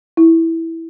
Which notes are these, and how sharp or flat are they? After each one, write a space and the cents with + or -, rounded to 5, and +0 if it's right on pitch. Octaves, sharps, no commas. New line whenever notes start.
E4 -5